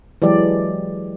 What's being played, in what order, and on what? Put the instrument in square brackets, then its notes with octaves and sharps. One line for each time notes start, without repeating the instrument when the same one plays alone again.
[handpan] E3 F#3 G#3 G4 D5